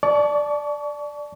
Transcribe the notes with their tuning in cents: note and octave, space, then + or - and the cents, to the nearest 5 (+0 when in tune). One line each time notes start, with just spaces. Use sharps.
D5 +0 A5 -20 C#6 +35